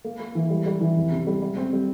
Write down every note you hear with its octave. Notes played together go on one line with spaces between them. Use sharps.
A#3
A#3
E3
G3
G3
E3
F1
C3
G3
G3
C4
G3